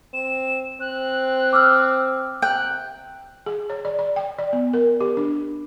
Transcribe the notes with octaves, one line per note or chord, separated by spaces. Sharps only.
C4 E7
C4 F#6
D6 E6 F6
C3 G5 F#6
G#4
C#5
D5
D5
G5
D5
B3
A#4
G4
D4